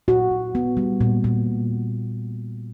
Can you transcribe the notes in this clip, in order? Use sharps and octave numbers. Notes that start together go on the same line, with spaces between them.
A#2 F#4
A#2
B3
G3
A#2
A#2